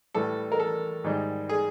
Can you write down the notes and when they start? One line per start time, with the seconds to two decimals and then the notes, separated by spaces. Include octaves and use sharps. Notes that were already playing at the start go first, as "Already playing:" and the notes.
0.15 A2 E3 G3 A4
0.52 A#4
0.60 A4
1.04 G#2 D#3 G3
1.49 G#4